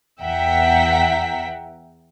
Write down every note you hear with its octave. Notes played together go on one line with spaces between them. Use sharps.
E2 E5 F#5 G5 A#5 B6